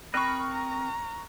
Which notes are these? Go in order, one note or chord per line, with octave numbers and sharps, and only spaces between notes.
C4 A#4 D#5 B5 C#6 F6 F#6
A#5